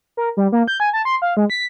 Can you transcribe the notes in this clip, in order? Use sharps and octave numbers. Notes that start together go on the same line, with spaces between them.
A#4
G3
A#3
G6
G#5
A5
C6
F5
G#3
B6